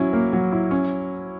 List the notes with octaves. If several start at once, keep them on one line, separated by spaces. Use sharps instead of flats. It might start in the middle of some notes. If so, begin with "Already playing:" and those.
Already playing: F#3 C#4 E4
A#3
F#3
E4
C#4